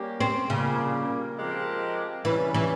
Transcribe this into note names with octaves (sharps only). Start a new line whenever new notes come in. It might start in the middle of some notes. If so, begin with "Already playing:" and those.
Already playing: G3 A#3 C#4 G4
C4
A#2 C#3 G3 A#3
F3 G#3 C4 G4 A#4
C3 E3 G3 C#4
E3